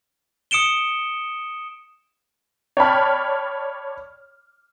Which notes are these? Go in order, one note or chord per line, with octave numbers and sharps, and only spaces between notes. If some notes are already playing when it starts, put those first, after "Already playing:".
D#6 C#7 D7 E7 G7
C#5 D5 G5 A5 B5 F6